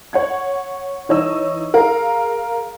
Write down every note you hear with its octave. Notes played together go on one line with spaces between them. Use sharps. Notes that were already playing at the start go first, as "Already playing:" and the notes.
C#5 F#5 G#6
E3 D#4 C#5 D#5 E6
G#4 A#4 F5